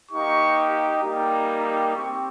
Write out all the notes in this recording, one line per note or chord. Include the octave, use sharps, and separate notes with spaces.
A#3 D#4 G4 C#6
G3 A#3 D#4 G4
C4 G4 C#6